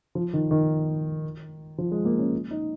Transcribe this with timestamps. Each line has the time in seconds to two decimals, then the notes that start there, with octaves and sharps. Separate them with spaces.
0.15 F3
0.33 D#3
0.51 D#3
1.78 F3
1.92 G#3
2.05 A#3
2.19 C#4
2.51 D#4